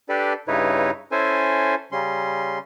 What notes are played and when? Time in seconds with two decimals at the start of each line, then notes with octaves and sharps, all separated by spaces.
0.09 D4 G4 A4 B4 D5
0.48 G2 C#3 D#4 E4 B4 C#5
1.12 C#4 E4 A4 C5 G#5
1.92 C#3 G3 C#4 C6